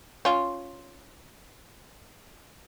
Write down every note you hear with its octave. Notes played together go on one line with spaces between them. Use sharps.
C#4 F4